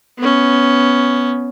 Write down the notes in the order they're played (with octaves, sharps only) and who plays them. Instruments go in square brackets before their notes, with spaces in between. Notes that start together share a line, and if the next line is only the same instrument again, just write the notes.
[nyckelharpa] B3 C#4